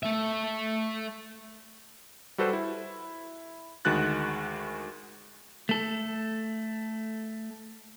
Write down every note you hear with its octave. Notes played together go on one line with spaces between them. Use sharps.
A3 E5
G3 F#4 A4 B4 C5
E4
D2 D#3 G#3 F#4 F#6 A6
A3 A4